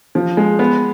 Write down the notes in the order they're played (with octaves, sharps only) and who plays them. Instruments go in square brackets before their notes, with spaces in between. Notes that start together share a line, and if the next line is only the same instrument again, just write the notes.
[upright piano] F3
G#3
B3